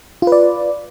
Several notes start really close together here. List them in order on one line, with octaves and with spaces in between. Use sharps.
F4 B4 D5